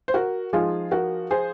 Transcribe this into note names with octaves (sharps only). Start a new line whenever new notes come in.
C5
F#4 A#4
F3 G#3 D#4 F4 G#4
F#4 A#4
G#4 C5